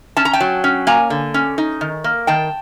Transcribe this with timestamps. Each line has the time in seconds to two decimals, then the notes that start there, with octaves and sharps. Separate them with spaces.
0.17 C#4 A5
0.25 A#5
0.33 G5 A5
0.41 F#3
0.64 C#4
0.87 A#3 G#5 A#5
1.10 D3
1.34 C#4
1.58 D#4
1.81 D#3
2.04 A#3
2.27 D#3 G5 A5